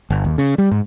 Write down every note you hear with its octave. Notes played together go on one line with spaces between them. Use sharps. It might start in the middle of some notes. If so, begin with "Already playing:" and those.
G1
D#2
C#3
G3
G#2